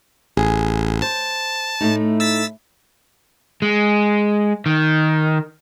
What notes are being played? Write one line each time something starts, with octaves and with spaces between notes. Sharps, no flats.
A1 G#4
C5 A5
A2 A3 D#4
E6 A6 B6
G#3
D#3